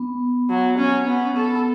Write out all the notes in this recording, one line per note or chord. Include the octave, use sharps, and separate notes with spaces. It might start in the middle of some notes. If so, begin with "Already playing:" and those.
Already playing: B3
F#3
C#4
B3
C#4
B3 A4